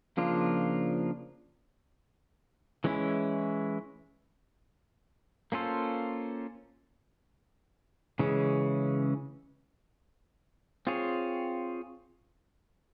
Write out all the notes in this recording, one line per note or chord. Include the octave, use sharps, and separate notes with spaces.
C#3 F3 A#3 D4 F4
E3 G#3 C#4 E4
A#3 C#4 F4 A4 C5
C#3 E3 G#3 C#4
C4 F4 G#4 C#5